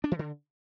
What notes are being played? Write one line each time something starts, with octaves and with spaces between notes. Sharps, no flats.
D4
E3
D3